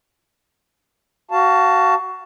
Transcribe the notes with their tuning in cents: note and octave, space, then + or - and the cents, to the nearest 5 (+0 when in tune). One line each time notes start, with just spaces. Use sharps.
F#4 +15 F5 -5 A5 +10